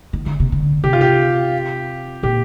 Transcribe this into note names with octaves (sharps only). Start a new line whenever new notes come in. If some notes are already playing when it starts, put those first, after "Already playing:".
D#3
D3
C3
D3
C3 G4
F4
G4
A#2 G4